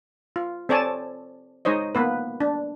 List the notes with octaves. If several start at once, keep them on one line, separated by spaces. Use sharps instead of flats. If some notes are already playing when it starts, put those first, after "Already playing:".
F4
C4 A4 C#5 D5 G#5 A5
G#3 D#4 C5 C#5 D#5
A#3 B3 B4
D4